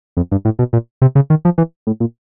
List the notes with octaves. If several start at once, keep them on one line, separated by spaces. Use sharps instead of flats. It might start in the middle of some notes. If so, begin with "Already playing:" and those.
F2
G2
A2
B2
A#2
C3
C#3
D#3
F3
E3
A2
A#2